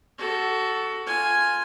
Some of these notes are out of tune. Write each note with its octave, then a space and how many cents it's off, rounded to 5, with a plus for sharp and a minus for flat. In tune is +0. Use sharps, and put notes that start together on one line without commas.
F#4 +15 A4 +0
F4 +0 G#5 +0